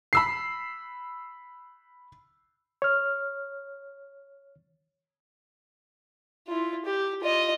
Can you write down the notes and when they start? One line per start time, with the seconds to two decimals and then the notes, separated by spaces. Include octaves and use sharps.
0.13 B5 E6 C7
2.82 C#5 F6
6.47 E4 F4
6.85 G4
7.22 F4 D#5